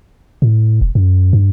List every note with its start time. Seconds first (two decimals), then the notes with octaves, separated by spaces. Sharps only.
0.42 A2
0.81 E1
0.95 F#2
1.33 G2